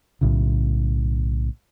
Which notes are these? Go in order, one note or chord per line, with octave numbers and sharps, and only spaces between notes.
B1 A2 C#3